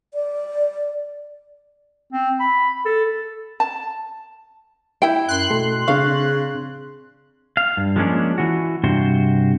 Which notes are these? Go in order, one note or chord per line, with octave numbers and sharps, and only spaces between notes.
D5
C4
B5
A4
A5
E4 G5
F#2 C6 F#6
B2 A3 A4
C#3 C4 D4 F5 C#6
F5
G2
F3 G#3 A#3 B3 C#4 D4
E3 F#4
G2 C3 F#4 C5